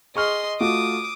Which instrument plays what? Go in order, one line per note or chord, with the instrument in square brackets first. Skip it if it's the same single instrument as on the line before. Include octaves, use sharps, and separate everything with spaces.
[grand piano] G#4 C#6 F6 [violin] D#5 C6
[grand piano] A3 F4 F#4 [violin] D6 D#6